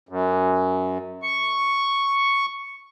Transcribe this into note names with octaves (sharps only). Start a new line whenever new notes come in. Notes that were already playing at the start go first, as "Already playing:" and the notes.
F#2
C#6